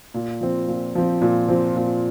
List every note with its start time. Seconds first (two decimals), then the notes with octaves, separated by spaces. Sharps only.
0.14 A#2
0.41 F3 C4
0.68 A#2
0.95 F3 C4
1.22 A#2
1.48 F3 C4
1.76 A#2